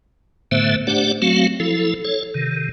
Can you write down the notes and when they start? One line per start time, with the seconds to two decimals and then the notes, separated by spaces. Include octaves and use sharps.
0.52 A2 D3 A3 B3 C5 E5
0.87 A3 D4 G4 C5 D5 F#5
1.22 F#3 A3 C4 F#4 F5
1.60 F3 E4 A4
2.05 A4 C#5
2.34 C3 D#3